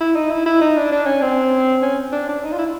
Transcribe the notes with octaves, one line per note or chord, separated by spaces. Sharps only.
E4
D#4
E4
E4
D#4
D4
D4
C#4
C4
C#4
D4
D4
D#4
F4
E4